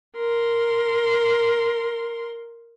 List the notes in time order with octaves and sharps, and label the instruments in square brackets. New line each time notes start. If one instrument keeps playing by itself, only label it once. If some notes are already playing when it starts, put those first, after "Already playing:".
[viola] A#4 C6